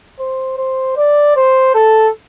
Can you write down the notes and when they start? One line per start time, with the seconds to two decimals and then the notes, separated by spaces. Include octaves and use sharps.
0.20 C5
0.58 C5
0.97 D5
1.36 C5
1.75 A4